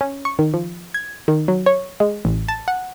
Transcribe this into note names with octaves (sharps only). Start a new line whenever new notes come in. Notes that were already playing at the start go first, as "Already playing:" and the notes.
C#4
C#6
D#3
F3
G#6
D#3
F#3
C#5
G#3
A1
A5
F#5